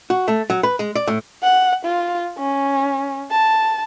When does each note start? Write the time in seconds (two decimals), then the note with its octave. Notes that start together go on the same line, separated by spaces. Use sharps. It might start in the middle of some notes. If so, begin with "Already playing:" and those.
0.10 F#4
0.28 A3
0.50 F#3
0.63 B4
0.79 G#3
0.95 D5
1.08 A2
1.43 F#5
1.85 F4
2.38 C#4
3.31 A5